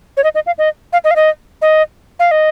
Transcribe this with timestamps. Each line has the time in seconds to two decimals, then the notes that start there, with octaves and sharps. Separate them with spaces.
0.17 C#5
0.24 D#5
0.35 D#5
0.46 F5
0.58 D#5
0.93 F5
1.04 D#5
1.11 F5
1.16 D#5
1.62 D#5
2.19 F5
2.31 D#5